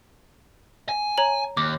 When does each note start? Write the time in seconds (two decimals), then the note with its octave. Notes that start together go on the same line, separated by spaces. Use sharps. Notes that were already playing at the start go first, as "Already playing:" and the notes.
0.89 G#5
1.18 C#5 A#5 F#7
1.57 D#2 D6